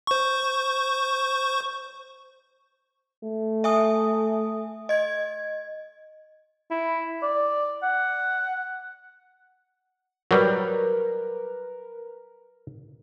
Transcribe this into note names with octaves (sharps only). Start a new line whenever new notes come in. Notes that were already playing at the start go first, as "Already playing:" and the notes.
C5 C#6
A3
E5 G#5 D#6
D#5 G#6
E4
D5
F#5
F#3 G3 A#4 B4